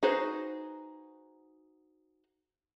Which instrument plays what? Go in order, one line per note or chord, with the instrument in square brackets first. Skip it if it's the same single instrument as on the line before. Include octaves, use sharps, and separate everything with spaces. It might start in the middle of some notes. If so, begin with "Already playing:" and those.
[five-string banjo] D#4 F#4 G#4 B4 C5